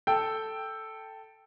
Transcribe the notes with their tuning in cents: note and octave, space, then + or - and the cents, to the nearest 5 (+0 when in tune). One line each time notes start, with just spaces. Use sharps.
A4 +0 G5 +0